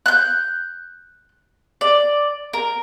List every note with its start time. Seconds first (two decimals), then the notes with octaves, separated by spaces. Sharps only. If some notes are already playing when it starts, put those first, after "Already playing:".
0.06 F#6 G6
1.81 D5
2.53 A#4